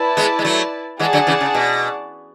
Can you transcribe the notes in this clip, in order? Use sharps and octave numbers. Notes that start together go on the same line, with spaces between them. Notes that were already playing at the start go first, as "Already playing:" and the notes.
Already playing: E4 B4 D5 A5
G#3 B3
G#3
F#3 A3
E3 G#3 G#4 D5 F#5 A5
D3 F#3
C#3 E3
C#3
B2